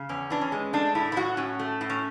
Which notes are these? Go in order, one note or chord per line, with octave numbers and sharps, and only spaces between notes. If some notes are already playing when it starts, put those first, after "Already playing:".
Already playing: C#3
E2 C#4
E3 D4
C#4
G#3
A3 D4
A2 E4
E4
F#3 F#4
A2 C#4
A3
A2
C#4